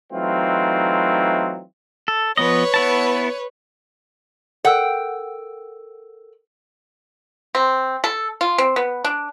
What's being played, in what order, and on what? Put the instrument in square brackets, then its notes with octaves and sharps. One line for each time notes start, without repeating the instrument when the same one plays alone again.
[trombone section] E3 F#3 A3 C4 D#4 F4
[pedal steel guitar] A4
[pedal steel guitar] F3 B3 D#5 [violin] B4 C#5
[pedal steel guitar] B3 E4 A5
[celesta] A4 A#4 E6 [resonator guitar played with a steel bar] F#5 G5
[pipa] C4
A4
F4
C4
B3
D4